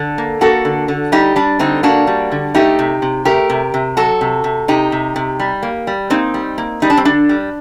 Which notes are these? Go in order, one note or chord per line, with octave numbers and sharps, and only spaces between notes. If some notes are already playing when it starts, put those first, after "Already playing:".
Already playing: D3 A4
A#3
A#3 F#4 A4
D3
D3
G3 D#4 G4
G3 D4
D3 C4 D#4
A#3 D4 F#4
G3
D3
A3 D#4 G4
C3
C3
A3 G4 A#4
C3
C3
F#3 F#4 A4
C3
C3
C3 D#4 G4
C3
C3
G3
A#3
G3
A#3 C4 D#4
G3
A#3
G3 D#4
D4
C4
D3 D4
G3